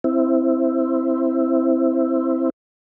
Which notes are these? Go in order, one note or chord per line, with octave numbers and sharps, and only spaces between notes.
C4 E4